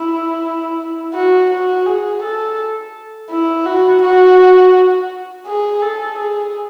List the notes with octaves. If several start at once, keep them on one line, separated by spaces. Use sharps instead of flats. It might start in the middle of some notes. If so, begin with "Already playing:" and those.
Already playing: E4
F#4
F#4
G#4
A4
E4
F#4
F#4
G#4
A4
G#4